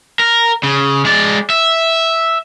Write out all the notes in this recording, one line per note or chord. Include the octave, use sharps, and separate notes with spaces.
A#4
C#3
G#3 D5
E5